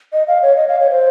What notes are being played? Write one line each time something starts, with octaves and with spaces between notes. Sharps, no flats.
D#5
F5
C#5
D#5
F5
C#5
C5